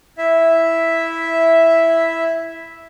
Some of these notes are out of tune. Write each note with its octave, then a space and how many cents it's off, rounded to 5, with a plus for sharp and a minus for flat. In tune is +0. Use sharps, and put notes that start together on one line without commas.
E4 +0 E5 +0